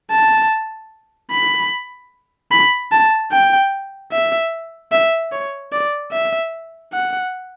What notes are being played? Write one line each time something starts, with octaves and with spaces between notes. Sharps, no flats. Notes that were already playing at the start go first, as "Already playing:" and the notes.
A5
B5
B5
A5
G5
E5
E5
C#5
D5
E5
F#5